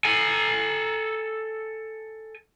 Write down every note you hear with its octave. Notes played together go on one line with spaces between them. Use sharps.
A4 G#5